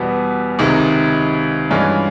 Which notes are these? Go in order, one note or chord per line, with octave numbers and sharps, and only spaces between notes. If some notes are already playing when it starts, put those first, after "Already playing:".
Already playing: E2 B2 G3 B3
C#2 C3 D#3 G#3
G2 E3 G#3 C#4 F4